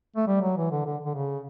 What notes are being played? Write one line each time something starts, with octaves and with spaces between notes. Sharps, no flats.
A3
G3
F#3
E3
D3
D3
D3
C#3